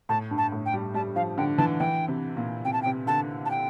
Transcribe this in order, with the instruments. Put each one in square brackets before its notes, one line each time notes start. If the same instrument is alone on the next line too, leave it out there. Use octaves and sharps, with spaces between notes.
[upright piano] A2 [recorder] A5
[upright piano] G2
[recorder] A5
[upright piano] A2
[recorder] G5
[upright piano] G3
[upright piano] G3 [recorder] A5
[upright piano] F3 [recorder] F5
[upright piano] D3 [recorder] G5
[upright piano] E3 [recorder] A5
[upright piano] E3 [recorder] G5
[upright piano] C3
A#2
[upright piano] C3 [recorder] G5
[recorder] A5
G5
[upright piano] C3
[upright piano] D3 [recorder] A5
[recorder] A5
G5